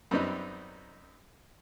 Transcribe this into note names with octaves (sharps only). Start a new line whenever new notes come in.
F#2 G3 B3 C4 D#4